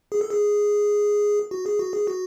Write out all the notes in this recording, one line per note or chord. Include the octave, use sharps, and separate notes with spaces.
G#4
A4
G#4
F#4
G#4
F#4
G#4
F#4